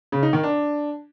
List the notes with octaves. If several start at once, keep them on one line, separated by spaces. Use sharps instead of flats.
C#3
D#4
D#3
D4